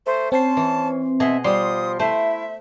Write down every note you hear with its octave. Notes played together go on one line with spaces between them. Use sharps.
A3 C5
C4 C#4 C5 A5 C6
E3
B2 G#4 D#5 E5
F3 G3 C6 D#6
A3 E4 C5 E5